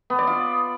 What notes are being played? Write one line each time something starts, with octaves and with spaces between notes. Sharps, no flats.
B3
D5
F4